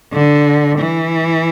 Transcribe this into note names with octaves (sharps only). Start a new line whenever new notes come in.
D3
E3